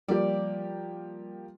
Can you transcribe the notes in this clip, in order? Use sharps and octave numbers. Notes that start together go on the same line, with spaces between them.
F3 G3 A#3 G4 D5